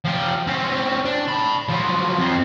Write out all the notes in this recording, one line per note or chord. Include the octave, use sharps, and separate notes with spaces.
F3 G4
C4 C#4
D4
A5 B5
F3 F#3
F2 C4